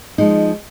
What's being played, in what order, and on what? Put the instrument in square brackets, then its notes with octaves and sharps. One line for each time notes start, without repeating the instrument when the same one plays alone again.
[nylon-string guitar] F3 G#3 D#4